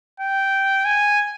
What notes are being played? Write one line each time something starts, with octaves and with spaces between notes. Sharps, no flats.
G5
G#5